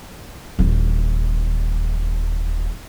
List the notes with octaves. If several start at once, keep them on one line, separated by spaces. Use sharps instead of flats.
D#1 E3